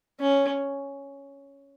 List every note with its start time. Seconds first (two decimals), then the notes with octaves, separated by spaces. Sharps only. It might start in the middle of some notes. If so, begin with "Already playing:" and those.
0.20 C#4